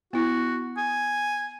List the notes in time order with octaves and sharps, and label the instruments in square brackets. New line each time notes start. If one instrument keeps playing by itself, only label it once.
[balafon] B3 E4 [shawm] F#4
[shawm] G#5